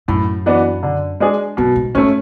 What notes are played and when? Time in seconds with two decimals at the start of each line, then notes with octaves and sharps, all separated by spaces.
0.08 F#2 A2
0.46 E3 B3 D4 F#4
0.83 D3
1.20 G#3 D4 G#4
1.57 F#2 B2
1.76 G#2
1.95 G#2 A3 C#4